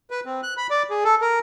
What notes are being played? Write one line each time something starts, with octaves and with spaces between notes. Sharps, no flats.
B4
C4
F#6
B5
D5
G#4
A4
A#4